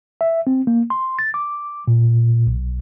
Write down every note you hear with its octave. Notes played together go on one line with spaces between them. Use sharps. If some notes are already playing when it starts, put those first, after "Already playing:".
E5
C4
A#3
C6
A6
D6
A#2
B1